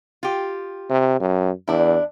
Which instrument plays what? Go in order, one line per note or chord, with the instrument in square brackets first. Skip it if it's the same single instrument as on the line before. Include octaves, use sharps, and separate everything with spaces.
[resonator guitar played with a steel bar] F4 G4
[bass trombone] C3
F#2
[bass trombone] E2 [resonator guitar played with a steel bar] D4 E4